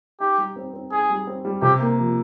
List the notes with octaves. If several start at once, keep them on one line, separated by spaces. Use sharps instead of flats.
D#4 G4
G3
C4
C4
D#4 G#4
G3
C4
G3
C3 G4
A#3
F3